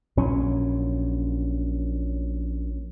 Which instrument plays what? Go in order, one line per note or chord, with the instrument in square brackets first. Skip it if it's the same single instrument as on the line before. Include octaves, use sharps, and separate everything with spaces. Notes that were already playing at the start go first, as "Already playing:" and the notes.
[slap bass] A#1 A#2 F#3 C#4